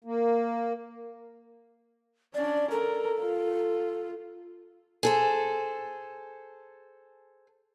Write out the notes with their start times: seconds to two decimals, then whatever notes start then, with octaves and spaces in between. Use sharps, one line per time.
0.04 A#3
2.34 C#4 D4 D5
2.71 A4 A#4
3.20 F4
5.03 G#4 A4 C5